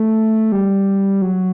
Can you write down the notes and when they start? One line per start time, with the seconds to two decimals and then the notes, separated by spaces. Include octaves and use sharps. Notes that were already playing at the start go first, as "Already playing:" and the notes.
Already playing: A3
0.52 G3
1.22 F#3